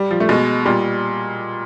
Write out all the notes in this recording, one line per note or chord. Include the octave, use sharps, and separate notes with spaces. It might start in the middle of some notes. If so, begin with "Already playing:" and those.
Already playing: G3
F3
A3
B2 G#3
A#2 G3